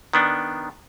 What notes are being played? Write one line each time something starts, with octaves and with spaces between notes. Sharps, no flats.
D#3 B3 D4